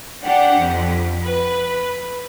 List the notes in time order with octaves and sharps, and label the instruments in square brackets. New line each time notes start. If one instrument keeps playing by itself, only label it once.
[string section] D4 G4 F#5
F2
B4